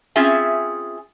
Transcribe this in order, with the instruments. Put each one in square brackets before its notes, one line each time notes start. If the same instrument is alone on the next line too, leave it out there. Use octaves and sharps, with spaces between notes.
[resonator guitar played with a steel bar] C4 C#4 F4 G#4 E5 G#5